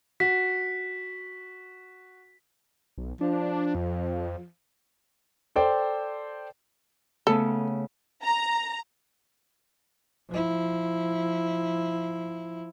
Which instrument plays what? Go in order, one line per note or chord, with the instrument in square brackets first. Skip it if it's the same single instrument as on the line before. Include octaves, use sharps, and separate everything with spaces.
[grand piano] F#4 [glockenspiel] B6
[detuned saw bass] B1
[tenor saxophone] F3 [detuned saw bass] D4
[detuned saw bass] F2
[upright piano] A4 C5 D5 G5
[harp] C#3 A3 B3 [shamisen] A4
[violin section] A#5
[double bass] F3 E4